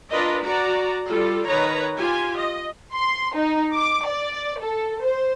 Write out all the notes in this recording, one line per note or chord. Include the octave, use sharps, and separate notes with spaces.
D4 F4 A#4 B4 D5 D#5
F#4 D5 A#5
G3 F4 A4
D#3 B4 C#5 A#5
F4 G4 G#5
D#5
C6
D#4
D6
D5
A4
C5